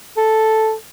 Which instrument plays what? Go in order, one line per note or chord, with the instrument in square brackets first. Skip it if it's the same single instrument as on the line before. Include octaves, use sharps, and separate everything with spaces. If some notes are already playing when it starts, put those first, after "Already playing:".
[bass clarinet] A4